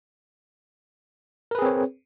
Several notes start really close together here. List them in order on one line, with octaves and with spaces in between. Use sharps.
A#4 B4 G#4 C4 C#5